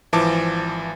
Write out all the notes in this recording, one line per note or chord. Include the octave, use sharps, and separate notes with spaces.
G#1 E3 F3 A5 D6